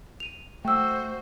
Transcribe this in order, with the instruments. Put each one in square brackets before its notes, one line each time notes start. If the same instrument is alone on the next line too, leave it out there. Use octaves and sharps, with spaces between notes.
[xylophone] D#7 F7
[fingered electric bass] A3 [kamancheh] F#4 C5 [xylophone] G5 E6